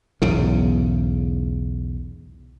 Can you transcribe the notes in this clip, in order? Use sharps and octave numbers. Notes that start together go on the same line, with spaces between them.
B1 E2 G#2 C#3